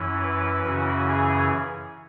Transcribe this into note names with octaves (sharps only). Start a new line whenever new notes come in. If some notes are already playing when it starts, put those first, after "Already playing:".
Already playing: F#2 E3 C#4 E4
B4
F#2 C#3 E3 C#4 E4 F#4
G#4